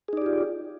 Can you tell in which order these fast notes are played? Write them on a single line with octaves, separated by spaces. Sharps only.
G#4 D#4 D5 G4 F4